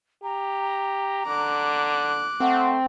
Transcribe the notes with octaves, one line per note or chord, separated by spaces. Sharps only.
G4 A#5
D3 D6 F#6
A3 C4 F#5